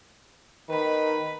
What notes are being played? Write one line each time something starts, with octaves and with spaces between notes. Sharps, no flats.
D#3 B4 B5